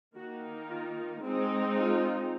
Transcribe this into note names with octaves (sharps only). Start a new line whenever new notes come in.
D#3 A#3 D#4 F#4
F4
G#3 C4 D#4
F4